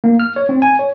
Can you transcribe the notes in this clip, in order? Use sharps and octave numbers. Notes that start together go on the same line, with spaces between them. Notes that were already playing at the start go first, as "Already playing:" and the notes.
A#3
F6
C#5
C4
G#5
C#5